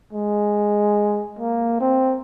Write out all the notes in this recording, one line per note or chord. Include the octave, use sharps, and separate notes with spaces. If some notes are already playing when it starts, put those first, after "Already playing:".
G#3
A#3
C4